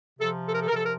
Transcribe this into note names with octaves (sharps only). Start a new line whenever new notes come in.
C3 F3 A4
A4
A#4
A4
A#4
C3 F3 A4
A#4